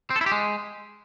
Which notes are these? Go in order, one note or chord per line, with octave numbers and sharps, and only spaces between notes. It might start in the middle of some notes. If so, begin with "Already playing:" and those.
C4
A4
E4
G4
G#3